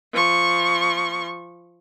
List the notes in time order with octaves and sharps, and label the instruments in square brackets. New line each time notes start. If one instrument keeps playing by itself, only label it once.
[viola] F3 C#6